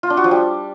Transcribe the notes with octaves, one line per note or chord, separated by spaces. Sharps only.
F4
D4
F#4
F3
G3